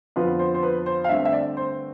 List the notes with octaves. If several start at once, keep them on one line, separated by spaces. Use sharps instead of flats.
F2 D3 F3 B3 F4 B4
C5
C5
B4
C5
F5
G2 D3 A3 C4 E5
E5
D5
C5